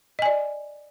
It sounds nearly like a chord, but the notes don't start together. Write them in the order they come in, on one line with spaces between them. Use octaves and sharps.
D#5 G#5 D5